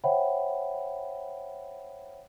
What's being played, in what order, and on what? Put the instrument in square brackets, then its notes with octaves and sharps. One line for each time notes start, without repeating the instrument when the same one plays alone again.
[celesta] C5 C#5 E5 F#5 G5 B5